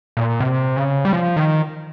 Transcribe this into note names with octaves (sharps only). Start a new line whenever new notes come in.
A#2
C3
C#3
G3
F3
D#3